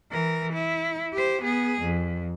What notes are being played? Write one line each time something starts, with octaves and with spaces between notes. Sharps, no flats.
E3 A#4
E4
G4 C5
B3 G#4
F2